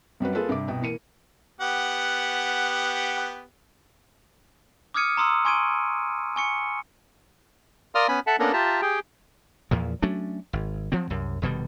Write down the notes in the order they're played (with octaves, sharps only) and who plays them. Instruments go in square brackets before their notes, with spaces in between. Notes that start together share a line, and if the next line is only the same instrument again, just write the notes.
[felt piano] F#2 G3 F#4 B4
A#3 F4 G#4 A4 B4
G2 C3 D6
C2 B2 G5
E3 A#3 C#7 D#7
[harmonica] B3 G4 F#5
[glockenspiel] D6 D#6 F6 G#6 C#7 D#7
A#5 C6 D#6 E6
G#5 C6 C#6 G#6 D7 D#7
G#5 C#6 C#7
[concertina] A#4 D5 F5 C6 D#6 F6
B3 C#4 G#5 B5
A4 E5 F#5 A5
A#3 B3 C#4 D4 A4 A#4
F4 G4 E5 A5 A#5
G4 G#4 G5
[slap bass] E2 A#2 F3
F#3 A3 C#4 D4
G#1
F3 F#3 C4
C2 F#2
F1 B2 D#3 G3